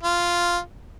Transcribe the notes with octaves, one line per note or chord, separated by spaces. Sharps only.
F4